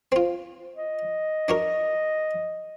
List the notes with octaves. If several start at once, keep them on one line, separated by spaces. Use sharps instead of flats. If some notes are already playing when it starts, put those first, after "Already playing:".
C4 F4
D#5
D4 F#4 A#4